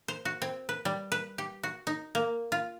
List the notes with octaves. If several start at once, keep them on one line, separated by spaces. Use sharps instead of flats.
C5
F#4
C4
B4
G3
B4
G4
F#4
D#4
A#3
F4